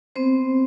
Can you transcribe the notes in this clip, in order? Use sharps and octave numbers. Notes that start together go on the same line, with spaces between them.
B3 C4 C5